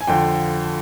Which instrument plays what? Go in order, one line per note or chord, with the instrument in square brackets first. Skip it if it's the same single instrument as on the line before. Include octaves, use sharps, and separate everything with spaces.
[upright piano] G#5
F2 D3 F3 G5